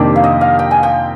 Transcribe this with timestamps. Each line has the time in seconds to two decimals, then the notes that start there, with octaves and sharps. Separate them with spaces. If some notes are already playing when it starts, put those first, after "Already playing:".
Already playing: F2 C3 D#3 A#3 D4 G4 A#4 C5
0.16 F5
0.24 D#5
0.41 F5
0.59 G5
0.71 G#5
0.83 G5